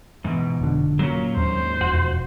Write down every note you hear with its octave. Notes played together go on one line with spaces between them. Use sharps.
G#2 B2 E3
F1 D3
A#2 F#3 C#4
D#2 G#2 C5
E1 F2 F#4